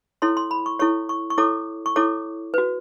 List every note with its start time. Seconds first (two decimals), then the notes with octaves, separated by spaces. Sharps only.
0.22 E4 A4 C#5 C6
0.37 C6
0.51 B5
0.66 C#6
0.79 E4 A4 C#5 C#6
1.09 C#6
1.30 C#6
1.38 E4 A4 C#5 D6
1.86 C#6
1.96 E4 A4 C#5 D6
2.54 F#4 B4